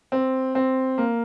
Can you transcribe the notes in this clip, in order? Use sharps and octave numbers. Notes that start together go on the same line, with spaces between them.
C4
C4
A#3